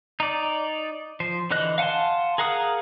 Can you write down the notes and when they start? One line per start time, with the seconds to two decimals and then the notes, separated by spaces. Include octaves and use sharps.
0.20 D#4 D5
1.20 F3 C5
1.51 D3 E3 C5 D#5 F#6
1.78 F5 F#5 G#5 A5 C6
2.38 G#4 A#4 F5 F#5 D#6